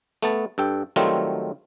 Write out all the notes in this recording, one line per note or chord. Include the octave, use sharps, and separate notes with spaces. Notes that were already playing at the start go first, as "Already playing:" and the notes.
A3 B3 A5
G2 A4 G5
D#3 F#3 G3 A3 C4 F4